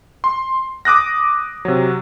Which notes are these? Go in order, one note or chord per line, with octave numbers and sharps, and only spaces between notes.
C6
D6 D#6 F#6 A#6
C3 F#3